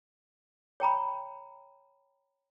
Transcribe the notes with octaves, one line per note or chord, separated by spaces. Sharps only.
C#5 G5 A#5 B5